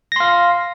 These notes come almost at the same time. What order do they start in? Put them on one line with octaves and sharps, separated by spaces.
A#6 C6 F5